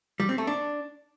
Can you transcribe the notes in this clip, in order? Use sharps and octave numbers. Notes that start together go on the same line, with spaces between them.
G3
C4
A3
D4